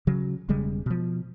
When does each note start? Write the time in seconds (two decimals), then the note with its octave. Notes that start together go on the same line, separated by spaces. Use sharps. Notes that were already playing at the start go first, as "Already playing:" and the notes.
0.07 C#3 F#3
0.49 E1 C#3 G3 G#3
0.86 B2 F3